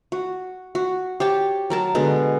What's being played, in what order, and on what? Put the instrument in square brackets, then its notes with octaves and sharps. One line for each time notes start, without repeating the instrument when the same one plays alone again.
[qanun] F#4
F#4
G4 C#5 A5
F#3 A#4 A5
B2 D3 G#3 B3